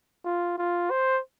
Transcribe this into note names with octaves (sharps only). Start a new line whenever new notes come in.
F4
F4
C5